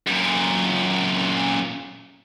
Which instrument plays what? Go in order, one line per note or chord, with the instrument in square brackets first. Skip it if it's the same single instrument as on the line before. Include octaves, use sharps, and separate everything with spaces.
[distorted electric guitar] F#2 A#2